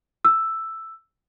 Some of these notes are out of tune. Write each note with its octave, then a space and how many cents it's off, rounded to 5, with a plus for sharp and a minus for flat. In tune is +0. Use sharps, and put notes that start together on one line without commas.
E6 +5